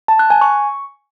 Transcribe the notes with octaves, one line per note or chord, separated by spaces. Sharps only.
A5
F#6
G#5
C#6